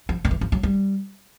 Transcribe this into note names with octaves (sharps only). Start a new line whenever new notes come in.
F3
D#3
E3
F3
F#3
G3